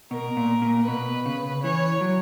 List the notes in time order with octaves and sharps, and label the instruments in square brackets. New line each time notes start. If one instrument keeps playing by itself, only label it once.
[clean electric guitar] B2 [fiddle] A#4
[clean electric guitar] A#2
A#2
[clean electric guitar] B2 [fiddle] B4
[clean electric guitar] C#3
[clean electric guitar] E3 [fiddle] C#5
[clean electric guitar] F#3